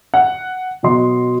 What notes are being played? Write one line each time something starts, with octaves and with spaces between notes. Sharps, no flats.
F#5
B2 F#3 D#5 C6